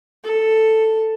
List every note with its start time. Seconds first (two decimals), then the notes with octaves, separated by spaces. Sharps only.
0.25 A4